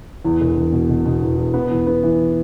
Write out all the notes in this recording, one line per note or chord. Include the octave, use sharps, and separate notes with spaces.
E2
E1
E1
B2
B2
B2
E2
E2
B3
E2
B3
E3